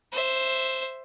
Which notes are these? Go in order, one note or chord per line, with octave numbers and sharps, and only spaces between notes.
C5 E5